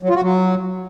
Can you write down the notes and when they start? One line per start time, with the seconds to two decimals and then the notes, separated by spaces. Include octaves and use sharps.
0.03 F#3
0.09 F4
0.16 F#4
0.22 F#3